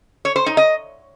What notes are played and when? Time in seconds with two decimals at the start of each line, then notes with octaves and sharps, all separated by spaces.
0.25 C#5
0.36 C5
0.46 D#4
0.57 D#5